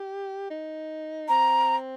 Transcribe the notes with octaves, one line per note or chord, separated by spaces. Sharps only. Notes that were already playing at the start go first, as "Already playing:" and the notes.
Already playing: G4
D#4
C4 A#5